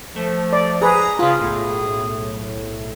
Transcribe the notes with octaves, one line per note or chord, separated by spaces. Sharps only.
F3 A3
D5
G#4 B4 A#5
C#3 F4 G#4 B4
B1 A2